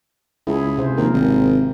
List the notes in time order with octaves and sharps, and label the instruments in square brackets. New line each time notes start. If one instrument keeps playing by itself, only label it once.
[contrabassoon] C#2 [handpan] E4 G#4
[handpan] C3 F4 C5
[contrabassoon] D#2 [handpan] F3 A#4
[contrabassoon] G#1